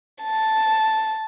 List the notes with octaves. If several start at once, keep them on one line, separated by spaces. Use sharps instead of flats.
A5